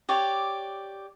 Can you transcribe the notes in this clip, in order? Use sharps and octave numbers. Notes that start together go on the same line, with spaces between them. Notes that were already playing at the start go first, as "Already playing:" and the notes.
G4 C#5 D5